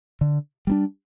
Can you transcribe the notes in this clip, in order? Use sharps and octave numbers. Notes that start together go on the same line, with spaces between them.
D3
G3 A#3 D4